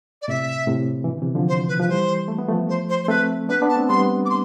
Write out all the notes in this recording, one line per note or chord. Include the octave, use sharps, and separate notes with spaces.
D5
A2 C3 E5
A2 C3
E3
B2 D3
C3 E3
D3 F3
C5
B4
F3 B4
E3 G3 C5
A3
B3
F3 A3
C5
C5
C5
A3 C4 B4
B3 D4 B4
B3 D4
A5
A3 C4
G3 B3 C6
D6
C6